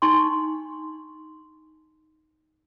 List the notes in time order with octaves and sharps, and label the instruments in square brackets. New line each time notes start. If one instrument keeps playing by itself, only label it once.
[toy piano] D4 D#4 C6 C#6